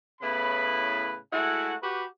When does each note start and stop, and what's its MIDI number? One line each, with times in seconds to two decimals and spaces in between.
0.22 1.17 45
0.22 1.17 49
0.22 1.17 59
0.22 1.17 64
0.22 1.17 71
0.22 1.17 83
1.33 1.75 56
1.33 1.75 57
1.33 1.75 64
1.33 1.75 66
1.33 1.75 78
1.83 2.05 66
1.83 2.05 67
1.83 2.05 71